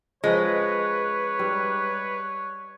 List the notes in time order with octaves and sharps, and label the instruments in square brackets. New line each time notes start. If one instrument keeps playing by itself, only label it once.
[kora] F3 C#4 A#4 [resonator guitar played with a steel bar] G#3 [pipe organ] B4 [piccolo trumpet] C#5
[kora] G3 D#4